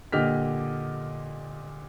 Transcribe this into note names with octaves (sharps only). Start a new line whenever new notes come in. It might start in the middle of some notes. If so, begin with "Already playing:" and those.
A#2 D3 G4 D#5 F6 B6